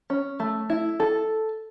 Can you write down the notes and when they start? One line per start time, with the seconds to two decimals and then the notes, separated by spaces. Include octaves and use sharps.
0.10 C#4
0.40 A3
0.70 E4
1.00 A4